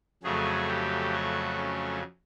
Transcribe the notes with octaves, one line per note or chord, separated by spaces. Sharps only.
F2 C#3 F#3 A3 G#4
G4
F#4
C#4